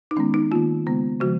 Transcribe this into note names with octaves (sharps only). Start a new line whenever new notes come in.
D#4
D#3 G#3 B3 C#4
D#4
D#3 A#3 F4
C#3 G#3 B3
C#3 F3 G#3 F#4